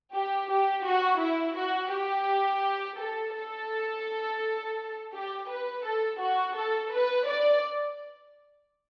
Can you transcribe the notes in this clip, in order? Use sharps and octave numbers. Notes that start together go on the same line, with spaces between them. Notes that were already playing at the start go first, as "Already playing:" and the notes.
G4
G4
F#4
E4
F#4
G4
A4
A4
G4
B4
A4
F#4
A4
B4
D5